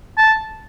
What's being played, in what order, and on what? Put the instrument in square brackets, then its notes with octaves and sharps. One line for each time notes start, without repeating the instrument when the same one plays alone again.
[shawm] A5